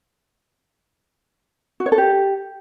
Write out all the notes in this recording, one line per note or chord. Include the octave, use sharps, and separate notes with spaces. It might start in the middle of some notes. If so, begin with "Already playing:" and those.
F#4
C#5
A4
G4